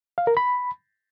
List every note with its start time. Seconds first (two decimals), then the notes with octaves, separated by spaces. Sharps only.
0.18 F5
0.27 A#4
0.37 B5